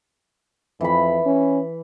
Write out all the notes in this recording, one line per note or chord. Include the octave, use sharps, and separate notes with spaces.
F2 E3 B5
C#4